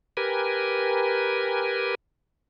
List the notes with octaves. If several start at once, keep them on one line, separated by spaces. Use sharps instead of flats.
G4 A#4 B4 G#5